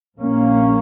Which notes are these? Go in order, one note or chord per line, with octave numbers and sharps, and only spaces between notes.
A#1 A#2 A#3 C#4